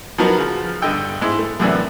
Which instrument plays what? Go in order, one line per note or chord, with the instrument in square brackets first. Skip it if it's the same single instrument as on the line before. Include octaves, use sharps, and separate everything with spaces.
[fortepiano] F3 F#3 B3 D#4 F#4 A#4
C#3 F3
G2 D3 D#5 G5 E6
G#2 G#3 E4
A3
F#2 A2 C3 E3 B3 D4